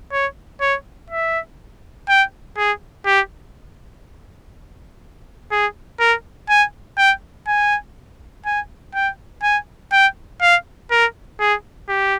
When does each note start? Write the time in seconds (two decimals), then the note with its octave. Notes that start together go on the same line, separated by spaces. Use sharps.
0.12 C#5
0.61 C#5
1.10 E5
2.09 G5
2.57 G#4
3.06 G4
5.52 G#4
6.00 A#4
6.50 G#5
6.98 G5
7.47 G#5
8.45 G#5
8.95 G5
9.43 G#5
9.92 G5
10.41 F5
10.91 A#4
11.40 G#4
11.89 G4